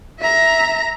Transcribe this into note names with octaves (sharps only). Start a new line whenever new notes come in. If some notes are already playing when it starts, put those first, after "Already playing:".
E5 A#5